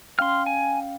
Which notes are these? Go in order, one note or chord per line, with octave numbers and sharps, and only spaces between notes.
C#4 F5 G5 C6 F6
G#5